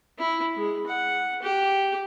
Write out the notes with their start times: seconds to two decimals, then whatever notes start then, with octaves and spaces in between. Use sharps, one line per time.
0.19 E4
0.57 G#3
0.86 F#5
1.42 G4